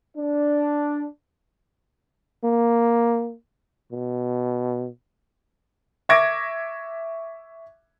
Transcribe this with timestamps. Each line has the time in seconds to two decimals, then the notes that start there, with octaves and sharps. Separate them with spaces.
0.17 D4
2.44 A#3
3.92 B2
6.09 E5 C#6 D6 G#6 A#6 D7